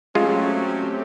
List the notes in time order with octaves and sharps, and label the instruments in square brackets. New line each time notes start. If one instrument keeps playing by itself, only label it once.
[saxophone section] F#3 C#4 [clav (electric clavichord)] G#3 F4 [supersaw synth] A3 C4 G4